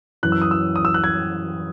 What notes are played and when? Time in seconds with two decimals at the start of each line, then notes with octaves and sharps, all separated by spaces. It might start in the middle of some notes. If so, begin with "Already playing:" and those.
0.23 F#2 E3 F#6
0.32 E6
0.42 D#6
0.51 E6
0.76 D#6
0.85 E6
0.94 F#6
1.04 G#6